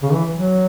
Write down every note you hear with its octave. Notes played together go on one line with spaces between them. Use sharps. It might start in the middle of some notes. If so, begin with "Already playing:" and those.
C#3
E3
F#3